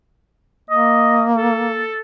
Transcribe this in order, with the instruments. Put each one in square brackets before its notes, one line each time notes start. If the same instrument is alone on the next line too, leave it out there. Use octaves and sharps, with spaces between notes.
[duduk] A#3 [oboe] D#5
[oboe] A4